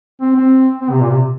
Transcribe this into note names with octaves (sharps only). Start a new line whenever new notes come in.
C4
C4
C4
C3
A#2
C3